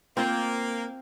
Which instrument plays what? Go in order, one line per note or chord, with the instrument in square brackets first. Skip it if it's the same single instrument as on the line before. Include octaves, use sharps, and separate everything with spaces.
[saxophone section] A#3 [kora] C4 F4 C5